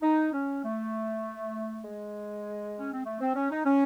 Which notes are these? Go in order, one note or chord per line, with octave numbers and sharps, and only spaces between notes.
D#4
C#4
A3
G#3
C#4
C4
A3
C4
C#4
D#4
C#4